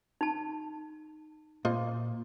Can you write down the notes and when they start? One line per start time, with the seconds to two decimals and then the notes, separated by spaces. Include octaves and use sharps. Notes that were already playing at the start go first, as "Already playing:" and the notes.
0.21 D#4 A5
1.65 A#2 F4 C5 D#5